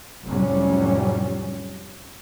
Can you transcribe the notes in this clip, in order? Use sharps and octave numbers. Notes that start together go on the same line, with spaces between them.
F1 A2 C3 F#3 G3 C#4